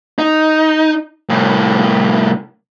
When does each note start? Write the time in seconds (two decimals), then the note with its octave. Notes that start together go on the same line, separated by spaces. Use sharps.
0.18 D#4
1.29 C2 A2